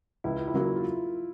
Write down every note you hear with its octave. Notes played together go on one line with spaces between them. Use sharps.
C#2 E4
F4
E4
C#3 F#3 A#3
F4